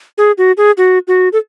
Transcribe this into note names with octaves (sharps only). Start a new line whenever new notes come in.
G#4
F#4
G#4
F#4
F#4
A4